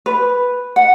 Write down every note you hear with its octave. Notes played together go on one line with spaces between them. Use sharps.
B4
F#5